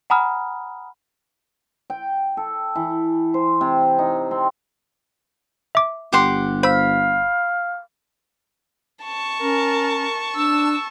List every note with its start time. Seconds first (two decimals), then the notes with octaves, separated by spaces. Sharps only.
0.10 F#5 G#5 A#5 B5 D#6 F6
1.90 G5
2.37 A4
2.76 E3
3.34 C5
3.61 C3
3.99 D#4
4.31 C4
5.75 E5 D6
6.13 G1 G4 F#5 C6
6.63 C5 F5 B5 E6
9.04 A5 C#6
9.41 C#4 A#4
10.35 D4 E6